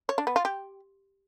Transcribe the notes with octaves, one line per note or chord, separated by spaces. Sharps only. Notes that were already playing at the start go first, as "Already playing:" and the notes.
C#5
D4
B3
F4
G4